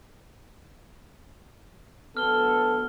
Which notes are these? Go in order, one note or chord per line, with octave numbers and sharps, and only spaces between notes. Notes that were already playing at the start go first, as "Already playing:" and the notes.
D2 F#3 B3 A4 F6 G7